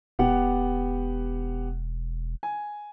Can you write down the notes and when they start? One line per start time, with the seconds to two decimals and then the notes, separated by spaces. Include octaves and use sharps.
0.19 E1 B3 G4 F#5
2.43 G#5